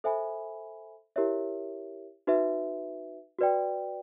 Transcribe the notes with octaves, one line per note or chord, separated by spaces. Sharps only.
A4 C5 E5 G#5 B5
E4 G4 A#4 C#5 E5
D#4 F#4 B4 E5
F#4 B4 D5 G5